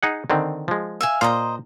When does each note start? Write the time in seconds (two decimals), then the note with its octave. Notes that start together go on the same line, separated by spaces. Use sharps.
0.03 D#4 G#4 F#5
0.30 D3 D#3 C4
0.68 F3 G#3
1.01 E5 F5 G#5
1.21 A#2 C5 D#5 F5 A#5